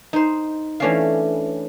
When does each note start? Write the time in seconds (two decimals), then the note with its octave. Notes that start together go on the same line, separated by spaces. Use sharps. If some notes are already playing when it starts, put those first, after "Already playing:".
0.13 D#4 C5
0.80 E3 A3 C#4 D4 D5 F5